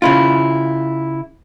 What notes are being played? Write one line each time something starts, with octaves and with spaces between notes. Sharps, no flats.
C#3 E4 F4